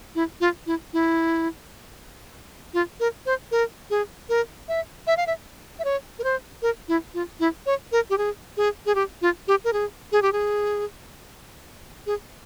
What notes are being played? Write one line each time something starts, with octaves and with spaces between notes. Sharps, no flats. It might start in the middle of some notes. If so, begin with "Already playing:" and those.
E4
F4
E4
E4
F4
A#4
C5
A#4
G#4
A#4
E5
E5
F5
E5
E5
C#5
A#4
C5
A#4
E4
F4
E4
C#5
A#4
G4
G#4
G#4
G#4
G4
F4
G4
A#4
G#4
G#4
G4
G#4
G#4